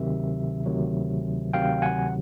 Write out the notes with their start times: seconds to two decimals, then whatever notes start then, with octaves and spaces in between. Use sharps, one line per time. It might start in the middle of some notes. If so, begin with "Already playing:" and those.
Already playing: D2 C3 D#3 F#3 E5
0.66 D2 C3 D#3 F#3
1.53 D2 C3 D#3 F#3 F5 G5
1.82 F#5 G#5